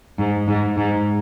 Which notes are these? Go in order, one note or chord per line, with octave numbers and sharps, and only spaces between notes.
G#2
G#2
G#2